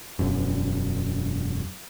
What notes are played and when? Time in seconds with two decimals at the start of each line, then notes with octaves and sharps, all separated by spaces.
0.19 E1 F#2